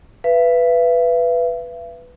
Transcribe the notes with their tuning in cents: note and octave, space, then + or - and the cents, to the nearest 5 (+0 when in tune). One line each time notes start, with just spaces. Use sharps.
B4 +0 E5 +45